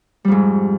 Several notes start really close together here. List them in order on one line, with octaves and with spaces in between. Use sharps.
G3 F2 G#2